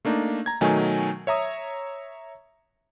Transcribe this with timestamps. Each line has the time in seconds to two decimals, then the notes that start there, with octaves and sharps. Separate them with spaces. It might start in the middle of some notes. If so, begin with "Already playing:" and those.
0.05 A3 A#3 D4 D#4
0.46 A#5 G#6
0.61 B2 D#3 F#3 A3 D#4 G#5
1.27 C#5 E5 A#5 D#6